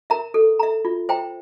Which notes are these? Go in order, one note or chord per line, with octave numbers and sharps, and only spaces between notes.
A#4 E5 A#5
A4
E5 A#5
F4
C5 E5 G5 A#5